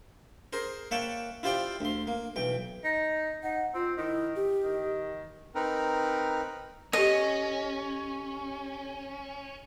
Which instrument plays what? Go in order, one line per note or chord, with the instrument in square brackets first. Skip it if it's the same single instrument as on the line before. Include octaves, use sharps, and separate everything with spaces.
[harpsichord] G#4 A#4 C5
A#3 C#5 E5 F#5 G5 A5
E4 F4 G4 C5 D5 G5
D2 C6
A#3
B1 E3 G5
[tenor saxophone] D#4
[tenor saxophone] D#4 [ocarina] F#5
[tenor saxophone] C4 [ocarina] F4
[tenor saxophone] D#3 [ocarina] E4
[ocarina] G4
[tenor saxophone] D#3
[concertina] C4 D#4 A#4 B4
[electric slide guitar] C#4 [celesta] G4 A4 [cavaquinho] D#5